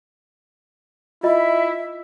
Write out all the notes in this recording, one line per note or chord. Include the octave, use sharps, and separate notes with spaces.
E4 F4 D#5 E5